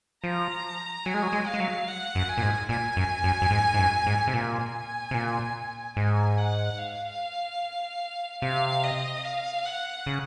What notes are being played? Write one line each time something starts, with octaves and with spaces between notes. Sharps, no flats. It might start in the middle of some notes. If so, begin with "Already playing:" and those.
F3 A#5
F#3 G#5
G#3
F#3
G#3
F5
G#3
F#3
F#5
F#2
G#5
A#2
G#2
A#2 G#5
F#2
F#2
F#2
G#2
G#2
F#2
G#2
C3
A#2 G#5
C3
A#2
G#2 G#5
F#5
F5
C3 F5
D#5
F5
F#5
C#3